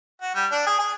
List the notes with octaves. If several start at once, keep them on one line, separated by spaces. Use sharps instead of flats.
F#4
G3
D4
G#4
G#4